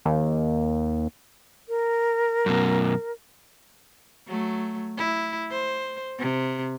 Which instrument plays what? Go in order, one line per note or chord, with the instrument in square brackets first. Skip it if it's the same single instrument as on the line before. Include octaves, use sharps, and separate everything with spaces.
[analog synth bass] D#2
[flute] A#4
[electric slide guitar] F#2 B2
[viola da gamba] F#3 A3
E4
C5
C3